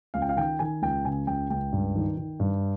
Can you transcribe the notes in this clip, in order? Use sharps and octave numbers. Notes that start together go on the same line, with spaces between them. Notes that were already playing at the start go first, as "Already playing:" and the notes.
C#2 F5
G5
F5
D#3 G5
D#3 G#5
C#2 G5
C#3 G#5
C#2 G5
C#2 G5
G2
D#3
D#3
G2